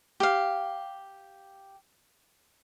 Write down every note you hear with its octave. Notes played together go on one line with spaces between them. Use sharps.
G4 F5